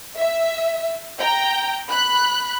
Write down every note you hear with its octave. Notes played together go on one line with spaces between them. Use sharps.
E5
G5 A#5
B5 F#6